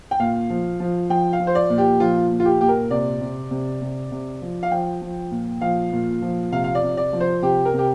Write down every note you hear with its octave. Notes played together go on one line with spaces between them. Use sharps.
G5
A#2 F5
F3
F3
F3 G5
F5
F3
C5
D5
A#2
G4
F3 F4
A#2
F4
G4
A#2 G4
A#4
C3 D5
C3
C3
C3
C3
F3
F5
F3 G5
F3
A#2
F3 F5
A#2
F3
C3 F5
F5
D5
C3
D5
F3
C5
C3 G4
A#4
C3 G4